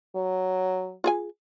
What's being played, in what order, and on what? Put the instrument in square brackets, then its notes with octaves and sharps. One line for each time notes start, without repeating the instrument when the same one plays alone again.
[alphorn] F#3
[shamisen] F4 G#4 G#5